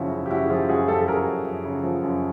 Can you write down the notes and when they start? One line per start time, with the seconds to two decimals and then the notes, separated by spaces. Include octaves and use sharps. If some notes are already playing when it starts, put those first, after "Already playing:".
Already playing: F#2 C#3 F3 E4 F#4
0.11 C#3
0.26 G4
0.30 F#2 E4 F#4
0.45 G#4
0.50 F3 F4 G4
0.69 F#2 F#4 G#4
0.88 F#2 G4 A4
1.01 A4
1.08 F#2 G#4 A#4
1.27 F#2
1.45 F#2
1.65 C#3
1.84 F3
2.03 F#2